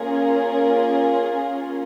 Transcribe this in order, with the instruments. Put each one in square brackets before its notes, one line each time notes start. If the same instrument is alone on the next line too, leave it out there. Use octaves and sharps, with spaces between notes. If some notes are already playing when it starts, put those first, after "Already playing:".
Already playing: [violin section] A#3 C#4 F4 G#4